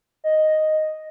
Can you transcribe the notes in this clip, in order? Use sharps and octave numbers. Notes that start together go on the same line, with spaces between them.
D#5